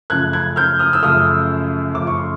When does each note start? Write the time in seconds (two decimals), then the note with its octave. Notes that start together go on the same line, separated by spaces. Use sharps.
0.10 F#2 C#3 F3 A3 F#6 G#6
0.33 F#6 G#6
0.56 F6 G6
0.79 D#6 F6
0.93 E6
1.03 F#2 C#3 F3 A3 D#6 F6
1.95 F#2 C#3 F3 A3 D6
2.07 C#6
2.17 C6